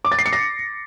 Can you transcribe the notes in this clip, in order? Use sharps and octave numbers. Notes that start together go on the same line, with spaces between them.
D6
A6
C7
C#7
A#6